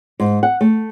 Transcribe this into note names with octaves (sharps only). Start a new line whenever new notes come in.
G#2
F#5
A3